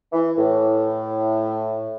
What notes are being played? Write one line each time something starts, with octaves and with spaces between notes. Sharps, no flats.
E3
A2